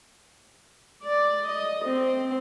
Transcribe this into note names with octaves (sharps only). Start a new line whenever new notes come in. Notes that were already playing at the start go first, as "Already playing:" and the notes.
D5
D#5
C4